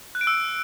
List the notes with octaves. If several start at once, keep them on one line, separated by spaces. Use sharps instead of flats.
F#6
D7
E6